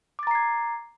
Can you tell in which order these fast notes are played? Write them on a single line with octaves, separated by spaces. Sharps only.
D6 A6 A#5 C7 G#6